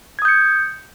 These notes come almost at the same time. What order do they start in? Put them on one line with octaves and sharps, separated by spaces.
G#6 D#6 G6 C#7